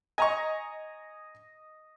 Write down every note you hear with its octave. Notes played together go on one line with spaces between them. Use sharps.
D#5 G#5 A#5 C#6